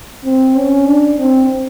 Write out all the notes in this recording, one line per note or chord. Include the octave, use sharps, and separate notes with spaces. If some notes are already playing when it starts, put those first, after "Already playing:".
C4
C#4
D4
C4